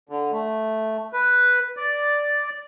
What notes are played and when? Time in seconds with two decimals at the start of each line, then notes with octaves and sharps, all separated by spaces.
0.09 D3
0.32 A3
1.13 B4
1.77 D5